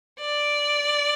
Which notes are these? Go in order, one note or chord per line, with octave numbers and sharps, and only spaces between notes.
D5